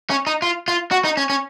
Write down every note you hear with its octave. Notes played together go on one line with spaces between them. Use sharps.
C#4
D#4
F4
F4
F#4
D#4
C#4
C#4